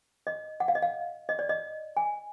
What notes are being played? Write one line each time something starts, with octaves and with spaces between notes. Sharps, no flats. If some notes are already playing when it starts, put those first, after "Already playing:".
D#5
F#5
F5
D#5
F5
D#5
D5
D#5
G#5